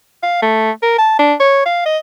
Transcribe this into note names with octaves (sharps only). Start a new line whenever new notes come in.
F5
A3
A#4
A5
D4
C#5
F5
D#5